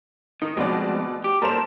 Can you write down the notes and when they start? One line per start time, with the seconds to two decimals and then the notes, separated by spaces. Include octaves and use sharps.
0.42 D#3 D#4
0.57 D2 B2 F3 G#3 C4 D5
1.24 G4
1.42 A#2 G3 A4 A#4 C5 E7